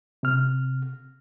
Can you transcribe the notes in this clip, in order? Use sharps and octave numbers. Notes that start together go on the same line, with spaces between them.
C3 F6